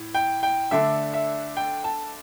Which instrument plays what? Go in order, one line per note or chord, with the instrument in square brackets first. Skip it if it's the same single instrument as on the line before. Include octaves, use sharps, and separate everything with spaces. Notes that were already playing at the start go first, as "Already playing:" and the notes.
Already playing: [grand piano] A2
G5
G5
D3 A3 D4 E5
E5
G5
A5